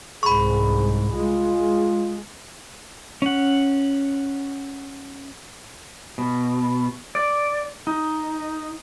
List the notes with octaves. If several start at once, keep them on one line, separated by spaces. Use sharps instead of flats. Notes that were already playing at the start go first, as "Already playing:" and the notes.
C2 G#2 G#4 B5 C#6
G#3 F4
C#4 F#5
B2
D5
D#4